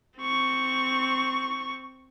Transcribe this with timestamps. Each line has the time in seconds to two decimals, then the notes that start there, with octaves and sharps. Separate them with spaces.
0.18 C4 C#6